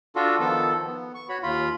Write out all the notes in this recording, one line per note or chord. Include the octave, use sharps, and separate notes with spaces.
D4 F4 F#4 A4
D#3 F3 B3 A4
B3
C#6
F#4 C#5 B5
D#2 F4 B5